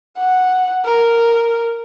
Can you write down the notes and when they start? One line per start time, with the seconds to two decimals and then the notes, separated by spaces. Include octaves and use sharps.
0.18 F#5
0.85 A#4